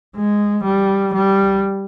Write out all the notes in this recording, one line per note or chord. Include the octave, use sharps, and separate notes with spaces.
G#3
G3
G3